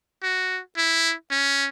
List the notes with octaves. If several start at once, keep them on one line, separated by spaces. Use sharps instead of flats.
F#4
E4
C#4